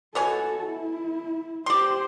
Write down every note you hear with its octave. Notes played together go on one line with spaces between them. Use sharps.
B2 F#4 A4 C#5 G#5
E4
G4 C5 D5 C6